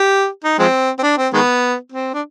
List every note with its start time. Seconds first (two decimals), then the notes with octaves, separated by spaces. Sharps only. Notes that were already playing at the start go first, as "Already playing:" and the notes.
Already playing: G4
0.44 D#4
0.59 F3 G#3 C4
0.99 C4
1.03 D4
1.18 C4
1.33 D#3 G#3 B3
1.92 C4
2.14 D4